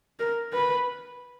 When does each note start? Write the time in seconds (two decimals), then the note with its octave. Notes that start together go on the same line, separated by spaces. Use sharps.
0.20 A#4
0.53 B4